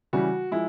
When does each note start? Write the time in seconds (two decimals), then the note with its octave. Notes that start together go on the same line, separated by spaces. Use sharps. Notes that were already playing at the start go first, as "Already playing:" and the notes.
0.13 C#3 E3 G3 F#4
0.51 F3 G#3 E4